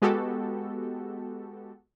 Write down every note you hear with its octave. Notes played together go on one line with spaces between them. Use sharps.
G#3 B3 F#4 G4 A4